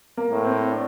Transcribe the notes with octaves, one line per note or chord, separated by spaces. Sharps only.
A#3
A2
C4
D4